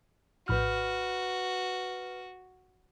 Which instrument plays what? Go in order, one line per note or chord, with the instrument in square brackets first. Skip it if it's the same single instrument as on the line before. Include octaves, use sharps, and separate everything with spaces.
[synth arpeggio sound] A#1 A2 G6 [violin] F#4 [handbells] B4 B5 F6